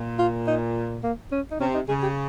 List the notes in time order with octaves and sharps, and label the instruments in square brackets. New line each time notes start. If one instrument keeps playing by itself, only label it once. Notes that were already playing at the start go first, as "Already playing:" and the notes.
Already playing: [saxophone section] A#2
[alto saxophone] F4
D#4
A#3
C#4
D#4
[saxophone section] C3 [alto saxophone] C#4
[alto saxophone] D#4
[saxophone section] C#3 [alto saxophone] G#4
[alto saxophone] G4